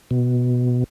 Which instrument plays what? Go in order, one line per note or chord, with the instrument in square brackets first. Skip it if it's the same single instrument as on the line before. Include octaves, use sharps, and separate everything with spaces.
[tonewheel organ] B2